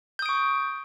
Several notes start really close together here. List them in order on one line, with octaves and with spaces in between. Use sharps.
G6 D#6 D7 C#6